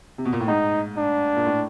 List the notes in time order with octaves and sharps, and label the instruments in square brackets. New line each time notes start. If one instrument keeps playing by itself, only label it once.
[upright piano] C3
B2
A#2
A2
[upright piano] G#2 [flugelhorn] D#4
[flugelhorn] D4
[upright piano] A#2
A2